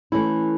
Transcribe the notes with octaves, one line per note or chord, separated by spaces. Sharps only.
E3 A3 C#4 E4